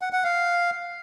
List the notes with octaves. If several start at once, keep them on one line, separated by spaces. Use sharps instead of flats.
F#5
F#5
F5